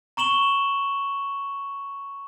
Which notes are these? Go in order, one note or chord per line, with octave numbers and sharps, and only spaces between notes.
A#5 C#6 E7 F#7 G7